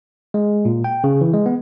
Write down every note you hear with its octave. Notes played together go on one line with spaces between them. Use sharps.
G#3
A#2
G5
C#3
E3
G#3
B3